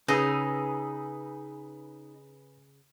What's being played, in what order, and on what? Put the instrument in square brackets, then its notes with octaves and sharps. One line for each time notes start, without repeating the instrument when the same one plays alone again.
[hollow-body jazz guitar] C#3 [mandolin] D#4 [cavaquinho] G#4 [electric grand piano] B4 D#6 E6